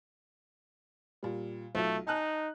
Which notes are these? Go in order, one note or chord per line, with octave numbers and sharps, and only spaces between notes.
A#2 G3
B1 A3 F4
D#4 G#5 A5 F#6